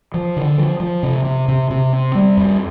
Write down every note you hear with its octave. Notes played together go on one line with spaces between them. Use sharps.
F3
D3
F3
F3
C3
C3
C3
C3
C4
G3
F2